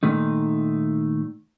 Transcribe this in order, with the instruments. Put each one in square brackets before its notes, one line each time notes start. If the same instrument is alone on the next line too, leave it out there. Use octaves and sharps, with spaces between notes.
[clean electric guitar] A#2 D#3 A3 D#4